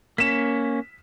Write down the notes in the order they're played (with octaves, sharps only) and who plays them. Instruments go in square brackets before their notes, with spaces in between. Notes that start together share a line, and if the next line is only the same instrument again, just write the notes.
[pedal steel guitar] A#3 C#4 [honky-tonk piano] B6 E7